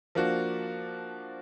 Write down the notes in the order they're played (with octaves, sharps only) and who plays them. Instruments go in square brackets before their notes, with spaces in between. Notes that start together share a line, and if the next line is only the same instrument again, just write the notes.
[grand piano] F3 A#3 D4 F#4